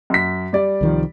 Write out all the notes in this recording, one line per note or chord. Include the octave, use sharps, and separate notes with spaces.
F#2 B6
G3 D5
C2 D#3 F3